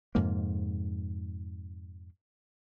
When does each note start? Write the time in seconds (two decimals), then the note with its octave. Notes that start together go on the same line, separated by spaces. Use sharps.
0.15 F2 G#2 C3 A#3